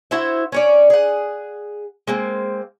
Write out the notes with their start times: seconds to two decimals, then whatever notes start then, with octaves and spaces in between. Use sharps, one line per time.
0.11 E4 F#4 C5 E5
0.52 C#4 C#5 D5
0.90 G#4 F#5
2.07 G#3 A#3 C4